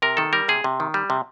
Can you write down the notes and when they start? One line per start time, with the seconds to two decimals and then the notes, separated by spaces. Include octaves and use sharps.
0.02 C3 A#4
0.17 D#3 A4
0.33 G3 A#4
0.48 C3 G#4
0.64 C3
0.80 D#3
0.94 G3
1.10 C3